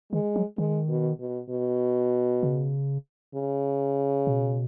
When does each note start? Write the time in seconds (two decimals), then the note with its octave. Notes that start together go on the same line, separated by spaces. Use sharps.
0.12 D#3 G#3
0.36 F#3
0.58 D#3 G#3
0.89 B2
1.20 B2
1.50 B2
2.43 C#3
3.35 C#3
4.27 B2